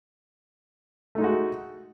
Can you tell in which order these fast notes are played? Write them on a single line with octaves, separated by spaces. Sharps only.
A3 D#4 G#3 F#4